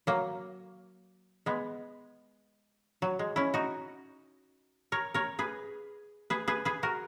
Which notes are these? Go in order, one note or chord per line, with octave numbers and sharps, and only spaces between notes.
F#3 A#3
G#3 B3
F#3
G#3
C#4 E4
D#4 F#4
A#4 C#5
A#4 C#5
G#4 B4
G#4 B4
G#4 B4
G#4 B4
F#4 A#4